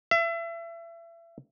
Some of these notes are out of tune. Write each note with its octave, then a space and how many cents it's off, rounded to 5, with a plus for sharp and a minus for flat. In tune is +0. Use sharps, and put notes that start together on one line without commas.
E5 +30